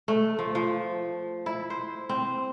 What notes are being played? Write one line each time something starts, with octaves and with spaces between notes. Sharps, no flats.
A3
F3
F3
E4
C5
C4